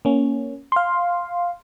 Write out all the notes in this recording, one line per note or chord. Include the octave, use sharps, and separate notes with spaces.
A#3 C#4
F5 C6